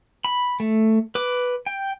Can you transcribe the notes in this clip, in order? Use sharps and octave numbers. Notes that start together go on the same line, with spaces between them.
B5
A3
B4 D6
G5